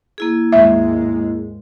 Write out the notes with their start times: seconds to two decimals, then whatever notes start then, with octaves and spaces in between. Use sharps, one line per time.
0.18 A#3 E4 G#4
0.53 D#2 G#2 G#3 E5